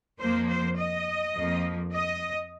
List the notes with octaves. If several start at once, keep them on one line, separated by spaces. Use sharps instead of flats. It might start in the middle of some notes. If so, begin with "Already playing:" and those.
F2 F3 A#3 C5
C5
D#5
F2 F3 A#3
D#5